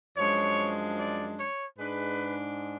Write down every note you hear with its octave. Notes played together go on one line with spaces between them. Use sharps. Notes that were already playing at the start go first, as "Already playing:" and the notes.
F#2 F3 G#3 D4 C#5
D5
C#5
G#2 G#3 D4 B4